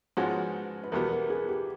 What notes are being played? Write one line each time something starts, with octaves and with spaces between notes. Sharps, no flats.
G#2 F3 G#3 C#4 F#4 B4
B4
E2 B2 G3 B3 A#4
A#4
G#4
G4